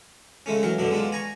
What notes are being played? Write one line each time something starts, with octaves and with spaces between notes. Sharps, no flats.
C#3 G#3 A3 C#4
E3 F#3 A#4
F#2 B2 D3 D4
G#3 B3 D4 F4
G#5 A#5 C#6